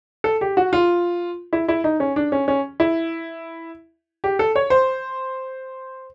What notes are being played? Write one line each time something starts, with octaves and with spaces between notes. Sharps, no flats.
A4
G4
F#4
F4
E4
E4
D#4
C#4
D4
C#4
C#4
E4
G4
A4
C#5
C5